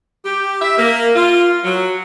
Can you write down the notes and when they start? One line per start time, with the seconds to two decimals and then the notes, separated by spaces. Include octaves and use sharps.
0.24 G4
0.62 E5
0.77 A#3
1.16 F4
1.64 F#3